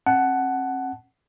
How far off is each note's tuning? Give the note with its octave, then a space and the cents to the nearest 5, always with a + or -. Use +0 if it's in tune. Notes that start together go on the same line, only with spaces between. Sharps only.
C4 +45 F#5 +10 A5 -20